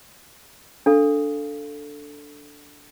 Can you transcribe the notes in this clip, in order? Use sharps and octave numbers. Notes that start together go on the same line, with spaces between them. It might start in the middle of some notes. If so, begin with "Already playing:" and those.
D4 A4 F5